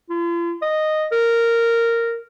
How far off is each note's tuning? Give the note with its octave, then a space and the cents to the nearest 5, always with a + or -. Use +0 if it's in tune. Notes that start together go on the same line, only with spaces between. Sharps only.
F4 -45
D#5 -5
A#4 -10